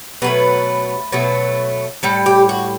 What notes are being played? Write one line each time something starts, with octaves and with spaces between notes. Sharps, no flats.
B2 F#3 A3 B4
B2 F#3 A3
A2 G3 A4
G4
F#4